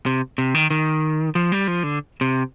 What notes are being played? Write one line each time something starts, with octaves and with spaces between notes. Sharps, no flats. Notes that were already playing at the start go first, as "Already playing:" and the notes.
C3
C3
D#3
D#3
F3
G3
F3
D3
C3